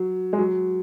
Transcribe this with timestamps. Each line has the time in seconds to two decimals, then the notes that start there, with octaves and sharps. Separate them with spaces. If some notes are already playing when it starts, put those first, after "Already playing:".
Already playing: F#3
0.33 G#3
0.38 F#3